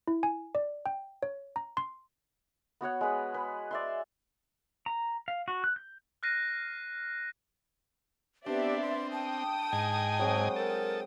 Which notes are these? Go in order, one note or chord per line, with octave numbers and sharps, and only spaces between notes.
E4
G#5
D5
G5
C#5
A#5
C6
B3 F#4 C#5 F#5
G#3 G#4 B4
B4
D5 E5 C6
A#5
F5
F#4
F#6
G6
F6 F#6 A#6 C7 D#7
B3 C4 D4 G4 D5 E5
C6
G5 A5 D#6
G#2 D#5 G#5
F#3 G#3 C4
A4 A#4